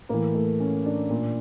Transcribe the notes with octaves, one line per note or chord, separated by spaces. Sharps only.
A2 E3 A#3
A3
C#4
D4
A#2